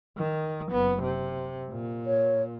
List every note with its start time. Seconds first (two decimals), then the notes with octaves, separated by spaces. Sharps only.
0.18 D#3
0.71 F#1 B3
1.03 C3
1.71 A#2
2.06 C#5